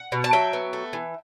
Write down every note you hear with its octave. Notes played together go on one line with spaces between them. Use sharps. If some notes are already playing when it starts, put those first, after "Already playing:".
Already playing: F#5
B2
A5
F#3 E5 G5
B3
A3
E3